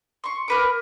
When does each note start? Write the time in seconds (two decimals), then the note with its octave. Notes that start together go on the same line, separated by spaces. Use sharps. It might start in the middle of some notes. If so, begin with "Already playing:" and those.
0.24 C6 C#6
0.48 A#4 B4 D6